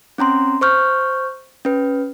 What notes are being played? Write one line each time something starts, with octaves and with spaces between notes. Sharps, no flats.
C4 C#4 A#5 C6
C5 C#6 F6 G6
C#4 B4